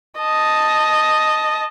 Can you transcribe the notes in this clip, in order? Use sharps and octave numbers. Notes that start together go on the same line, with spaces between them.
D#5 A5